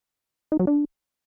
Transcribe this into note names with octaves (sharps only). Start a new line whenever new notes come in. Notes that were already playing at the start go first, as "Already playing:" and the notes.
D#4
F#3
D4